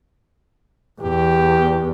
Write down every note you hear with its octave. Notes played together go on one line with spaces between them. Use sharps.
E2 G4